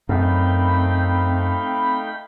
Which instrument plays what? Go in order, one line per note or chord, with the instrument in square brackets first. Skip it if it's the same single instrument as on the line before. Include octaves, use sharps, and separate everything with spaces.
[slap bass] F#2 [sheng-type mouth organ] A3 D#4 F5 [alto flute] C4 [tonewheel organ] G5 B5